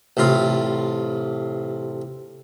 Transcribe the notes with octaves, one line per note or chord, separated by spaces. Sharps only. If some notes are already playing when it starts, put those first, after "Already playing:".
A1 A2 C3 F4